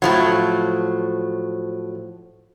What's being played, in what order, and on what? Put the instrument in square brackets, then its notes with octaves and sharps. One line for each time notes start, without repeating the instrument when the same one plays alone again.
[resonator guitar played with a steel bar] A2 F3 F#3